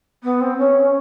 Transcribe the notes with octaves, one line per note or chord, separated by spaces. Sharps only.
B3
C4
C#4